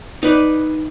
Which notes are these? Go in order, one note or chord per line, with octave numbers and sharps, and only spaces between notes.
D#4 B4 D5